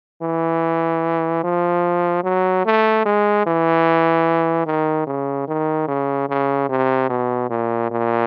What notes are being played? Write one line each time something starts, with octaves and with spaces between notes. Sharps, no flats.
E3
F3
F#3
A3
G#3
E3
D#3
C#3
D#3
C#3
C#3
C3
B2
A#2
A#2